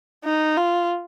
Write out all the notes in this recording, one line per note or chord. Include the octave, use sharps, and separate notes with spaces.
D#4
F4